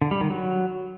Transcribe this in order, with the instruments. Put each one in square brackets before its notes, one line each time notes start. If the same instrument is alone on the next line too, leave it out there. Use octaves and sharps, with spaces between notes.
[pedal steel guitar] D3
G3
D#3
F#3